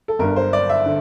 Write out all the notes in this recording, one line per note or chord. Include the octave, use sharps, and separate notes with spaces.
A4
G1 G2 D3 A#4
C5
D5
E5
D3